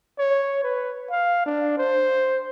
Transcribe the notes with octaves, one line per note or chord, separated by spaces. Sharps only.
C#5
B4
F5
D4
C5